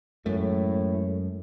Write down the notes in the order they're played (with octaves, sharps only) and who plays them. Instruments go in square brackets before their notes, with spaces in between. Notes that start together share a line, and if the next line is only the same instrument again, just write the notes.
[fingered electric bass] F#2 [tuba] A2 [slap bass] G#3 A3